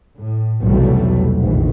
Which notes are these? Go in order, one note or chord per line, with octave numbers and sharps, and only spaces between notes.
A2
B1 E2 C3 F#3 G3 A3
F1 A#1 D#3 E3